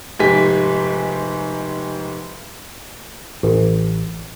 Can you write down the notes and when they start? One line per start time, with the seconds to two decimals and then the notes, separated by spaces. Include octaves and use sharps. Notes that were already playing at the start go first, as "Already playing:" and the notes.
0.19 F1 G#2 G4 G#5 B6
3.43 A1